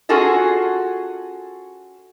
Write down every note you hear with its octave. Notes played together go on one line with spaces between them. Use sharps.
C#4 F4 F#4 G#4 A4 D#5